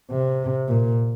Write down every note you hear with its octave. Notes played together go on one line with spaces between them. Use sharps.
C3
A#2